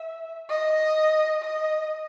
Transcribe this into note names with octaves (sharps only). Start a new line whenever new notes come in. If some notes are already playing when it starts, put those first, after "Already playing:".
Already playing: E5
D#5
D#5